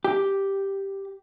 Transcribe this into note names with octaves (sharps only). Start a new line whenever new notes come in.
G4